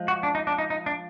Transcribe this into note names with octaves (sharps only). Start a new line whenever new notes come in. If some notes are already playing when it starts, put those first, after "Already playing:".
Already playing: F3 G#3
F#4
D4
D#4
D4
D#4
D#4
D4